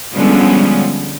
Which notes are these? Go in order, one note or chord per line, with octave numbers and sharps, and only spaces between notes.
D3 F3 G3 G#3 B3 C#4